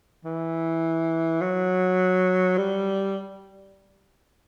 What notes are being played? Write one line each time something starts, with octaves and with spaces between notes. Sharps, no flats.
E3
F#3
G3